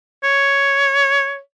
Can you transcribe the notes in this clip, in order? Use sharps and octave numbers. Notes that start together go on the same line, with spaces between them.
C#5